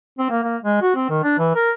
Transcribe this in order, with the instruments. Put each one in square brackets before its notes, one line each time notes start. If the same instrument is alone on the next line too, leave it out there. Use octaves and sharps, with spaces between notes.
[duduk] C4
A#3
A#3
G#3
F#4
C4
D#3
D4
E3
A#4